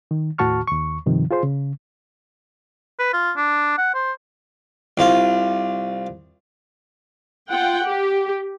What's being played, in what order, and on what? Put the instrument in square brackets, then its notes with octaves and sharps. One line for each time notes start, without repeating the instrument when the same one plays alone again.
[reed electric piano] D#3
D#2 A2 F#4 A5 C#6 F6
D#2 C#6
G2 C3 D#3 F3
F4 G#4 C5 C6
C#3
[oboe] B4
F4
D4
F#5
C5
[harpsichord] C2 F4
[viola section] F4 F#5 G5
G4